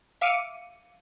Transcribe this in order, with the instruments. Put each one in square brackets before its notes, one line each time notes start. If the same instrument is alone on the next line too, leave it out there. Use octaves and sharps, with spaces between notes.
[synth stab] E5 F5 D6 C#7 D#7